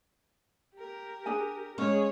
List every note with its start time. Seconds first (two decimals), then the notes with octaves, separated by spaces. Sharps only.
0.74 G4 A#4
1.26 D4 G#4 G#5
1.78 G#3 C#4 G#4 C#5